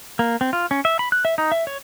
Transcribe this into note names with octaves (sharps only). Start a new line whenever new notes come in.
A#3
C4
F4
C#4
E5
B5
F#6
E5
D#4
E5
C#5